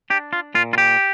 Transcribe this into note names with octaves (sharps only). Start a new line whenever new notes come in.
D4 G4
F4
A#2 F4
F4
G4